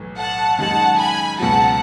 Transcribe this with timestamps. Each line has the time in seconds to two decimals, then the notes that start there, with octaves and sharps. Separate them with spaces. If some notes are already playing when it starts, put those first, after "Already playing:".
Already playing: B1 A2 E3
0.17 F#5 A5
0.59 F#2 D#3 G#3 D#4 G#4 F#5 A5
0.99 G#5 B5
1.40 C#2 B2 F#3 F#5 A5